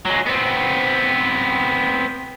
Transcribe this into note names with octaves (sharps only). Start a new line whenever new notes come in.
F#3 G#3
B3 C4